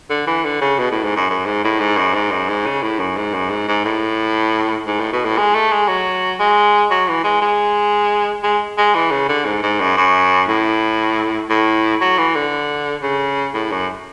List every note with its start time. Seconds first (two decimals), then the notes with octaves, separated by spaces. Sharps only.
0.10 D3
0.27 E3
0.44 D3
0.61 C#3
0.79 B2
0.92 A2
1.04 G#2
1.16 F#2
1.30 F#2
1.46 G#2
1.64 A2
1.80 G#2
1.97 F#2
2.14 G#2
2.31 F#2
2.49 G#2
2.66 C#3
2.83 A2
2.99 F#2
3.17 G#2
3.34 F#2
3.50 G#2
3.68 G#2
3.85 A2
4.87 G#2
5.00 A2
5.13 B2
5.24 A2
5.38 G#3
5.54 A3
5.72 G#3
5.88 F#3
6.40 G#3
6.91 F#3
7.08 E3
7.24 G#3
7.42 G#3
8.44 G#3
8.78 G#3
8.95 E3
9.11 C#3
9.29 D3
9.46 G#2
9.63 G#2
9.80 F#2
9.97 F#2
10.48 A2
11.49 A2
12.01 F#3
12.18 E3
12.35 D3
13.02 C#3
13.54 A2
13.72 F#2